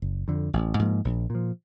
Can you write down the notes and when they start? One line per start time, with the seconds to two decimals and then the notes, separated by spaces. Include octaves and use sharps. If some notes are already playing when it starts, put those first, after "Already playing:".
0.02 F#1
0.28 F2 D3
0.53 A1
0.79 G#2 F3 A#3
1.05 A#1
1.30 A#2 F3